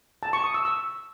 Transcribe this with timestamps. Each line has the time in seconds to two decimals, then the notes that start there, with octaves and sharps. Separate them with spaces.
0.23 A5
0.33 C#6
0.44 D#6
0.54 E6
0.65 E6